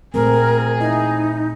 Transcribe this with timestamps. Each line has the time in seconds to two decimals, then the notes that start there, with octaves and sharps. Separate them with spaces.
0.14 A#2 A3 C4 G#4 A#4
0.80 D#4 E4 D#5